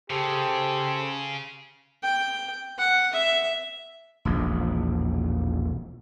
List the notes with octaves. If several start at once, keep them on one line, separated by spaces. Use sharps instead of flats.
C#3 G4 A4 C5
G5
F#5
E5
E1 A#1